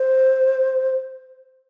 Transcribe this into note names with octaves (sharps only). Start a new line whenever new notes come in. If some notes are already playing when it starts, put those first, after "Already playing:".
Already playing: C5